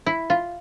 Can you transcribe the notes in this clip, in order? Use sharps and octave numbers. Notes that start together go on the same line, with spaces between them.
E4
F4